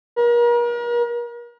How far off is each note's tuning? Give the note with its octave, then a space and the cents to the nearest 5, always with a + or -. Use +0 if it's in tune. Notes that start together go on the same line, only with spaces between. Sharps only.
A#4 +40